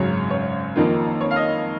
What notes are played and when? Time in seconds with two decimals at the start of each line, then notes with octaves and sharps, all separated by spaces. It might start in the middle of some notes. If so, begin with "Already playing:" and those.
Already playing: G#1 F#2 C#3 F#3 C#5
0.30 C#5
0.76 F2 D#3 A#3 F4
1.21 C#5
1.31 F5
1.36 D#5